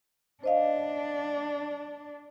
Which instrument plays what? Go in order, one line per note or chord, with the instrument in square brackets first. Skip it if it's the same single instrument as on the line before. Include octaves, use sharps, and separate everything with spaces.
[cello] D4 [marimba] C5 D#5 F5